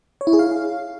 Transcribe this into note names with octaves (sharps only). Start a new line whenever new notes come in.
C#5
E4
G#4
F5